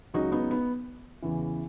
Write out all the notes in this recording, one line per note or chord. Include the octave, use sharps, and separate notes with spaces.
C#2 C#3 F#3 D#4 F#4
B3 D#4
B3
E2 C#3 E3